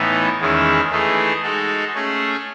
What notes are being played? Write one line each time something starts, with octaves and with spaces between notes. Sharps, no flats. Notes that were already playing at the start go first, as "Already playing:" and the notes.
Already playing: A2 E3 B3 D#4
E2 D#3 G#3 C#4 E4
E3 A3 D#4 G#4
G#3 D#4 F#4 A4
A3 C#4 G#4 C#5